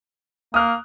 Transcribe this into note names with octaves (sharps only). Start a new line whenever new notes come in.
A#3 D#6 F6 F#6